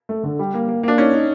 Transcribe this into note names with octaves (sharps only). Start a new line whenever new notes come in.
A3
D3
G3
A#3
A#3
A#3 D4
C#4 D#4
D#4